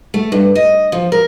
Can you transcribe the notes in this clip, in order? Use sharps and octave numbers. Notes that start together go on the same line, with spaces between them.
A3
G2
D#5
F3
A#4